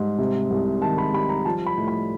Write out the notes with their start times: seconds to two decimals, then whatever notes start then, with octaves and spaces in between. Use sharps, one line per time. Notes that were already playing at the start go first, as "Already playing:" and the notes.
Already playing: G#2 G3
0.18 C3
0.51 C2
0.82 D#3 A5
0.98 B5
1.13 G3 B5
1.29 A#5
1.45 F3 A5
1.66 B5
1.77 A2
1.88 B5